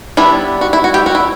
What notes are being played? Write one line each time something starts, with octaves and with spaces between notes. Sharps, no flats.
G3 B3 D4 E4
F#4
E4
F#4
E4 G4
F#4
E4